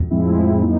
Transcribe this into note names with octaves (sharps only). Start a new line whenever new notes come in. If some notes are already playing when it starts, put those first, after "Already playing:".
Already playing: F2
A2 F3 G#3 C4 E4
F#3 A#3 D#4